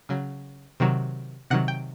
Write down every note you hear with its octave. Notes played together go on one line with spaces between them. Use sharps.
C#3 F#3
C3 D#3 F#3
C3 D#3 F#3 F#5
G5